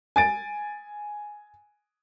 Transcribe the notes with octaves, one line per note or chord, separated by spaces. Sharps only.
G#5 A6 D7